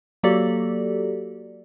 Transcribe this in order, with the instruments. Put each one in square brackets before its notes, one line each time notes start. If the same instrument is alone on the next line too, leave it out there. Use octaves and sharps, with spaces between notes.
[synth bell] F#3 A#3 F#4 G4 A4 D5